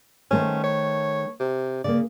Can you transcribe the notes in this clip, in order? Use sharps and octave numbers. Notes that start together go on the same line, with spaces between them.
D#3 A3 C#4 C5
C#5
C3
C#3 A#3 D5